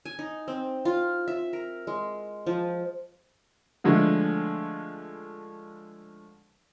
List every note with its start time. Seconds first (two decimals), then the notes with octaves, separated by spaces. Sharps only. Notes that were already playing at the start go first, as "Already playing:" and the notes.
0.05 G#5
0.19 D#4
0.48 C4
0.85 F4
1.28 E5
1.53 A#4
1.87 G#3
2.47 F3
3.84 D3 F3 G#3 A3